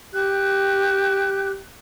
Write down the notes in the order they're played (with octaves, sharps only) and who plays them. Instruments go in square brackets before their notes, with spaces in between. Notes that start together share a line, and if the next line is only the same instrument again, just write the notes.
[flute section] G4 F#6